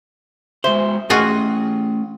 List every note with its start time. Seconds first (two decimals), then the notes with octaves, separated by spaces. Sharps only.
0.64 G#3 F#4 C5 E5
1.10 A3 C#4 F4 F#4 G#4 D#5